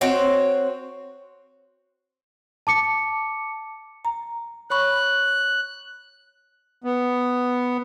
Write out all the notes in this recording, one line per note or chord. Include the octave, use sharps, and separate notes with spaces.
C4 F#4 C5 C#5
A5 D6 C#7
A#5
C#5 B5 C#6 F#6
B3